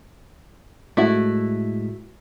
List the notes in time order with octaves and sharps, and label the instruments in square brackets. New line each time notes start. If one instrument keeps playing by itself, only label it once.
[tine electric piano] A2 G#3 B6 [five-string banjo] A3 E4 F#4